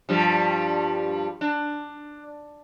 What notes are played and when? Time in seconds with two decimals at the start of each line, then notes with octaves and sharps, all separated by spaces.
0.09 G2 F3 G3
1.41 D4